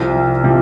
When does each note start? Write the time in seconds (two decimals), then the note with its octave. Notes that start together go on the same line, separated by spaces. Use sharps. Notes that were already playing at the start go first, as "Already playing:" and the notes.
Already playing: C2 C3 F3
0.44 C3 F3